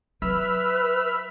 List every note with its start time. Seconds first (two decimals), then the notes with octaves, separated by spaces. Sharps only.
0.22 F#3 B4 E5 B5 F6